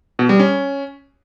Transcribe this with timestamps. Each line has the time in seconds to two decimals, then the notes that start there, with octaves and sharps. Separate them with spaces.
0.19 B2
0.29 G3
0.40 C#4